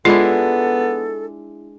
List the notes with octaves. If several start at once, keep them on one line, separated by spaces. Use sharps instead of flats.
G#3 B3 D4 E4 F4 A4